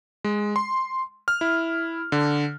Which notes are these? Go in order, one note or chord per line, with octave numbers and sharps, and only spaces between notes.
G#3
C6
F6
E4
D3